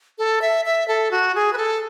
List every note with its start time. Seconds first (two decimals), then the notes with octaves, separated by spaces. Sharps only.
0.18 A4
0.41 E5
0.65 E5
0.88 A4
1.11 F#4
1.35 G#4
1.53 B4
1.58 A4